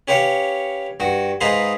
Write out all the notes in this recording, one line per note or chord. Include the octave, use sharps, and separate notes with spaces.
C#4 G4 B4 C#5 F5
G2 F#4
G#2 D#4 G#4 B4 F5 C6